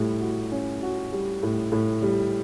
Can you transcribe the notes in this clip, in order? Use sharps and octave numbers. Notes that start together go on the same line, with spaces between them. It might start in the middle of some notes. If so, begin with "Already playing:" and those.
Already playing: A2 G3
F#4
C#4
F#4
G3
A2
A2
G3